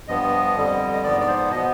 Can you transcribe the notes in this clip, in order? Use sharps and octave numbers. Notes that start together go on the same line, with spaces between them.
G2 F3 B3 D#5
F2 D3 G3
D#5
G#2 F3 B3 D5
D5
C5
B2 B3 D#5